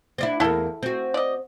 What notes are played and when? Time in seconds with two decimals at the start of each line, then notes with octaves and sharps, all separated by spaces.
0.18 C4 D4 E4
0.40 E2 A#3 E4 A4
0.83 C4 F#4
1.14 D5 D#5